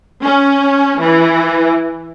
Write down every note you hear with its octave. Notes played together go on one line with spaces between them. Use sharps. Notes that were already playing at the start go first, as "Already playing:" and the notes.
C#4
E3